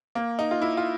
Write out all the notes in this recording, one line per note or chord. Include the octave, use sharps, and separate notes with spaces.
A#3
D#4
F4
E4
F4